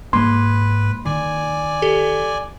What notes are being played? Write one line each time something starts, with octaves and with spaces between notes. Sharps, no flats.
G#2 A#3 B4 C6
D#3 D5 G#5
G4 A4